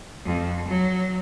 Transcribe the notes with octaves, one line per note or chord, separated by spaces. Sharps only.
F2
F#3